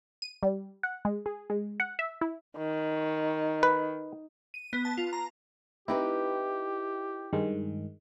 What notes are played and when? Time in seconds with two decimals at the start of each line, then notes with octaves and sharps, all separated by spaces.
0.22 D#7
0.43 G3
0.83 F#5
1.05 G#3
1.26 G#4
1.50 G#3
1.80 F#5
1.99 E5
2.21 E4
2.57 D#3
3.63 B4
4.54 D#7
4.73 B3
4.85 A5
4.98 F4
5.13 A#5
5.88 C4 D#4 E4 G4 B4 G5
7.33 G2 D#3 G#3